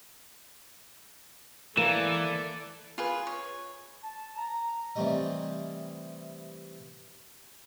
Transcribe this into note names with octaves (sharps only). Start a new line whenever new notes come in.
E3 A#3 A4 D5 E7
F4 G#4 B4
C#5
A5
A#5
C3 E3 G3 A3 G4 D#5